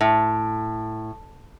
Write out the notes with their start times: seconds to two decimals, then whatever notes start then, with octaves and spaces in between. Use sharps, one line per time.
0.01 A2